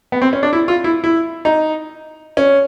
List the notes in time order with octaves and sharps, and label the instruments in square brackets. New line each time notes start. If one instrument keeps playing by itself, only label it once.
[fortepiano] B3
C4
C#4
D4
E4
F4
E4
E4
D#4
C#4